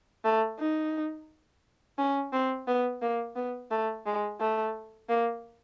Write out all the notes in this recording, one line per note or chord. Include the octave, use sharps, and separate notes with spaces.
A3
D#4
C#4
C4
B3
A#3
B3
A3
G#3
A3
A#3